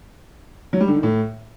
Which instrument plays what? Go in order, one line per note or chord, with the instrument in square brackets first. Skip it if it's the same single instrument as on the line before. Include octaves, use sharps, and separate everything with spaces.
[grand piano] F#3
G3
D3
D#3
A2